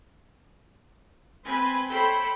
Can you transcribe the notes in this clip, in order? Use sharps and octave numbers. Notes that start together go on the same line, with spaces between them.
C4 B4 G#5 B5
A4 C5 C#5 G5 B5